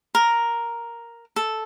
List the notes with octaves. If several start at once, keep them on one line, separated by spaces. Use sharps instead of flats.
A#4
A4